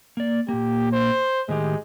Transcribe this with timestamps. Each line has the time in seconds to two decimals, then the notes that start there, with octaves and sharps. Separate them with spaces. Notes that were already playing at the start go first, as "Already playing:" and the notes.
0.17 A#3 D5
0.49 A#2 A#3 G4
0.93 C5
1.49 A2 D#3 G#3 G4